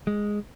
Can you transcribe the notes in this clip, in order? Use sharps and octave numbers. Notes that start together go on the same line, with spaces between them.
G#3